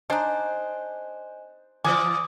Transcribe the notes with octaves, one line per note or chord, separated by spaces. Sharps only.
D4 D#4 C5 D#5 G#5 F#6
E3 F3 D5 G#5 D6 D#6